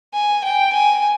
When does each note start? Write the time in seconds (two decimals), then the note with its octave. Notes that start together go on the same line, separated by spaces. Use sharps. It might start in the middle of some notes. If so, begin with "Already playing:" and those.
0.14 G#5
0.44 G5
0.73 G#5